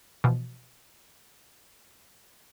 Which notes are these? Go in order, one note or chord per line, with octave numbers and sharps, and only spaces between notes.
B2 E3 F3